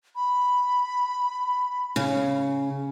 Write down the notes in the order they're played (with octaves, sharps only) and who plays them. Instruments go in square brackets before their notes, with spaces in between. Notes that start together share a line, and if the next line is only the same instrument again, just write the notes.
[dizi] B5
[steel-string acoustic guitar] C#3